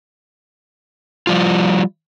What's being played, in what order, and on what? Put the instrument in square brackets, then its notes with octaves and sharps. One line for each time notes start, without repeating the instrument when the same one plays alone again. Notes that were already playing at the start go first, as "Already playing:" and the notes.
[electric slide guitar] F3 G3 F4